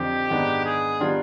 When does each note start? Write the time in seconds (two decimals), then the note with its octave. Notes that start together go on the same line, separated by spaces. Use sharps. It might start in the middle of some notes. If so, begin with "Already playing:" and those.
Already playing: F2 D3 F3 C4 D#4 G4
0.29 G#2 D#3 G#3 B3 D4
0.65 G#4
1.00 D#3 G3 B3 D4 F4